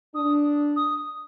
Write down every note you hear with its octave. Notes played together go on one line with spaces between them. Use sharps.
D4 D#6
D#6